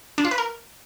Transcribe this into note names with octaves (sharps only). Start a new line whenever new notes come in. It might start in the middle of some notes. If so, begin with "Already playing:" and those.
D4
F4
B4
A#4